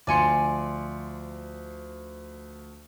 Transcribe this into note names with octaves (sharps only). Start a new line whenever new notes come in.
D2 F3 D5 G#5 C6 C#7